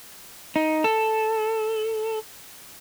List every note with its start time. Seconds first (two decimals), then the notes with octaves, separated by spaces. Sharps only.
0.56 D#4
0.84 A4